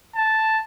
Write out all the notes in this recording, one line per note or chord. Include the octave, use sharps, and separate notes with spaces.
A5